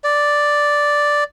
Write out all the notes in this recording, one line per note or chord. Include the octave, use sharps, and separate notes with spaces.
D5